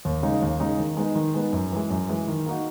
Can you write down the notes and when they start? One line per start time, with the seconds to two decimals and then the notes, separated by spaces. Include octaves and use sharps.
0.05 D#2
0.23 C#3 G#3 D#4 G#4
0.42 D#2
0.60 C#3 G#3 D#4 G#4
0.79 D#3
0.97 G#3 B3 D#4
1.15 D#3
1.34 G#3 B3 D#4
1.52 F#2
1.72 E3 G#3
1.90 F#2
2.09 E3 G#3
2.28 D#3
2.46 A#3 D#4 F#4